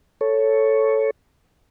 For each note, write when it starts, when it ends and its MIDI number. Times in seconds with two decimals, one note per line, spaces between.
0.21 1.10 69
0.21 1.10 73